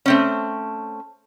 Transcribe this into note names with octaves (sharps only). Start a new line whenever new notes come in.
A3 C4 C#4